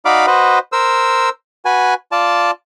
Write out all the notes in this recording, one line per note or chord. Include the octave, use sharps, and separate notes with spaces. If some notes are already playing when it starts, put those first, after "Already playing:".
D#4 F#4 D5 F5 B5 D6
F#4 B4 C5 D#5
A#4 C5 E6
F#4 B4 G#5
F4 D5 A5